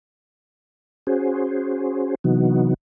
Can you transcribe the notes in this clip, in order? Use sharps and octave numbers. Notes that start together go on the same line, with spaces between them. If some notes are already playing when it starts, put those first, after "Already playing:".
C#4 F#4 G#4 C5
C3 E3 F#3 B3 D#4 F#4